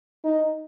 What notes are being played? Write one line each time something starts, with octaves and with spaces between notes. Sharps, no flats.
D#4